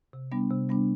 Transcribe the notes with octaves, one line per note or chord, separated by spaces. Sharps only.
C3
G3 B3 D4
C3
G3 B3 D4